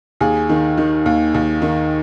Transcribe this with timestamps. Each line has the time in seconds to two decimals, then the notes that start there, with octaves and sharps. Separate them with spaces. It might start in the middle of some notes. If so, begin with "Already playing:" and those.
0.21 D#2 G#4
0.49 D#3
0.78 D#3
1.06 D#2
1.34 D#2
1.62 D#3